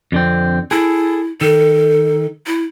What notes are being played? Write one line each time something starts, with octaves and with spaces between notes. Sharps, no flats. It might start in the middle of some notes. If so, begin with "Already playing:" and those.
F2 D3 C4
E4 G#4 A4
D#3 A4
E4